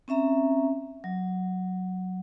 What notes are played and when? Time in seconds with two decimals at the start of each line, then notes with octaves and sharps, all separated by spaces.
0.08 C4 C#4 E5 A#5
1.04 F#3